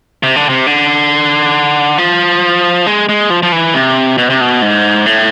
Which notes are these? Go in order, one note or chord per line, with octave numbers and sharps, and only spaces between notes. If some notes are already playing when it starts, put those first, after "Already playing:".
C3
D3
C3
D3
F3
G#3
G#3
F3
F3
E3
C3
B2
C3
B2
G#2
A2